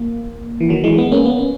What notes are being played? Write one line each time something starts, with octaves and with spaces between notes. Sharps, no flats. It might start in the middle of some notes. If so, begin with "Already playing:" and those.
Already playing: A#3
E3
D#3 F#3
E3 G#3
G#3 B3
A#3 C#4
B3
C#4